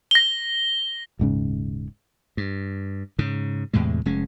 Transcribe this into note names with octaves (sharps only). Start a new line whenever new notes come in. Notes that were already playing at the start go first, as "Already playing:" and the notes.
A#6 G7
D#1 G#2 C#3
G2
G#2 C#3
E2 A2 C3 G#3
F1 G#3 C#4